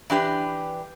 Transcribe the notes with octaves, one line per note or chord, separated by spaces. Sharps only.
E3 D4 G4 B4